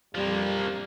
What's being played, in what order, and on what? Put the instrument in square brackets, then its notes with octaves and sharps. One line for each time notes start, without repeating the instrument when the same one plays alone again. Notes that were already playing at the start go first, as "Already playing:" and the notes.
[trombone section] F2 G3 [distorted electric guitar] F3 A#3